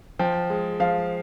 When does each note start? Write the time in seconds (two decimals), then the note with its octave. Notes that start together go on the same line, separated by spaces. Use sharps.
0.19 F3 G5
0.50 G#3
0.80 F3 F5